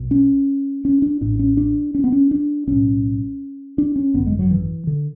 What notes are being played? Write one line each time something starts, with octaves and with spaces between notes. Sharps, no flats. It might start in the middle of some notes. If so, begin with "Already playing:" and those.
Already playing: B1 B2
C#4
C#4
D4
A1 A2 D4
C#4
D4
C#4
B3
C#4
D4
B1 A2 C#4
D4
C#4
G#1 F#2 D3 B3
G#3
F#3
E3
D3